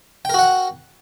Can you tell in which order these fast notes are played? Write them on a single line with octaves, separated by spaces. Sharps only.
G5 A#4 F#4 F#5